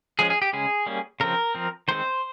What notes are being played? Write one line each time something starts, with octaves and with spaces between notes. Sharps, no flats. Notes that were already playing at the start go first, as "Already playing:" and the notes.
F3 G#3 C#4 G#4
G#4
G4
C#3 G#3 C#4 G#4
G3 A#3 C#4
C#3 F3 C4 A#4
F3 C4
D#3 G#3 C4 C5